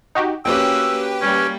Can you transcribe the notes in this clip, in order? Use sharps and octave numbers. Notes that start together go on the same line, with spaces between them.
D#4 F#4 G4
F2 A#3 C#4 F#4 G4 B4 G5 E6
G3 A#3 C#4